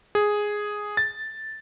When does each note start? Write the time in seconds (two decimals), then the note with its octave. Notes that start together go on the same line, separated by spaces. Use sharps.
0.15 G#4
0.97 A6